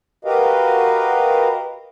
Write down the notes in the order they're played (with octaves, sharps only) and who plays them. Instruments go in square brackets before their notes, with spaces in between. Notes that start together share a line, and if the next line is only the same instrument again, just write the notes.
[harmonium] F#4 G4 A#4 B4 D#5 F5